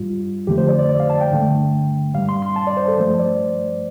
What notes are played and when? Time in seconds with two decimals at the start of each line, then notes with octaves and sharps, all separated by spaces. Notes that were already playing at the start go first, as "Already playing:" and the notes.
Already playing: G2 G3 F4
0.47 F2 D3 F3 A3 G4
0.58 C5
0.69 D5
0.79 D5
0.89 D5
1.00 F5
1.10 A5
1.21 G5
1.32 G2 D3 A3
2.14 G2 G3 F5
2.29 C6
2.42 C6
2.56 A5
2.67 D5
2.77 C5
2.88 A4
2.98 G2 F3 A3 C5
3.19 D5